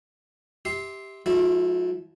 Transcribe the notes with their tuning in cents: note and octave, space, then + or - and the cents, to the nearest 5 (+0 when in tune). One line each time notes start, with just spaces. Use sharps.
G4 +0 E5 -25 C6 +0
F#3 -45 A3 -45 E4 +0